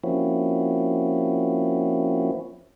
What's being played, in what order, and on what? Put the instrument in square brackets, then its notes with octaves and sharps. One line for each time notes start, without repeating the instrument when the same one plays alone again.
[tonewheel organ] F3 A#3 C4 C#4 E4 F#4